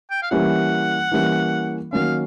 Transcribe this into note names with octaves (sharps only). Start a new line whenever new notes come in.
G5
F5
E3 G3 A#3 C#4 E4 F#5
E3 G3 A#3 C#4 E4
D#3 F#3 A#3 C#4 F5